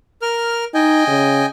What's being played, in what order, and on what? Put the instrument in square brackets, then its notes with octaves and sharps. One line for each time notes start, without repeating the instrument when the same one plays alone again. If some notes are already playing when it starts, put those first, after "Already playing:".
[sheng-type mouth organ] A#4 F6
[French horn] D#4 [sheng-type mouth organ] D#5 G5 G#5
[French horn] C#3